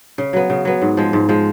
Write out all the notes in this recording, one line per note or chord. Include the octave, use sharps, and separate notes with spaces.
C#3
F#3 B3
C#3
F#3 B3
G#2
F3 G#3
G#2
F3 G#3